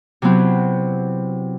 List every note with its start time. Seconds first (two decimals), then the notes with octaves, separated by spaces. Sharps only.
0.22 C3 F#3 B3 C4 E4